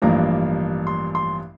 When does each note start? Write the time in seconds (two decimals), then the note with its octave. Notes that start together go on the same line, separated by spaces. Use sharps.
0.02 A1 G2 F3 A#3 D4 A#5
0.87 C6
1.15 C6